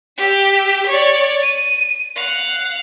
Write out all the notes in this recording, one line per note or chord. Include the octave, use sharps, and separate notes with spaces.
G4 E6
C#5 D5
D#7
F5 F#5